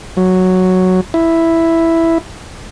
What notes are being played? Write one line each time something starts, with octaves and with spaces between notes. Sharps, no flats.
F#3
E4